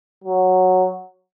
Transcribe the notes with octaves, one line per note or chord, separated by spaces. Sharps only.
F#3